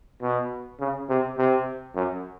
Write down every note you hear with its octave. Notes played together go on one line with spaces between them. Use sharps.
B2
C#3
C3
C3
F#2